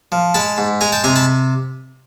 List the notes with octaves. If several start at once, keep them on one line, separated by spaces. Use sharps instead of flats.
F3
G#3 A5 B5
G#2
G#3 G#5 A#5
G5 A5
C3 G#5 A#5
A5 B5